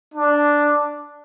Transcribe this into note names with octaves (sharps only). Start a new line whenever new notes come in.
D4